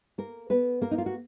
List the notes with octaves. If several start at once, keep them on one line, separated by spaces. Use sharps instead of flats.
A#3 A#4
B3 B4
A#3 A#4
D#4
F4
F#4